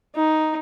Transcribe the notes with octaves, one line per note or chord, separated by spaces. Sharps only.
D#4